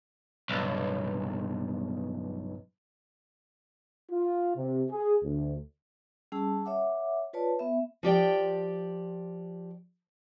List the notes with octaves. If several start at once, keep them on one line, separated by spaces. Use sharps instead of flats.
B1 G2
F4
C3
G#4
D2
G3 C#4 G#4 A5 E6
C#5 E5 F#5 D6
F4 B4 C#5 D5 A5
B3 E5
F3 G4 D5 G5